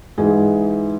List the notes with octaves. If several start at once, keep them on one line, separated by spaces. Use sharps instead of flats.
G#2 E3 G#4